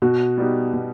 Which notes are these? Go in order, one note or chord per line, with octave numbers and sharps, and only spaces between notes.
B2 F#4
G3 B3 D#4 G4
B2